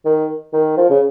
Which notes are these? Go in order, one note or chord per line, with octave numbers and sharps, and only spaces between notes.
D#3
D#3
F3
C#3